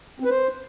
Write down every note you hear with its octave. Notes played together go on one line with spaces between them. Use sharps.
C4
B4
C5